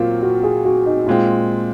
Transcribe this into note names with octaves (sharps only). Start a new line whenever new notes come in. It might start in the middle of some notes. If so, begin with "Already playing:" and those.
Already playing: A#2 F#3 C4 F4 A#4
F#4
G#4
F#4
D#4
A#2 G#3 C4 F4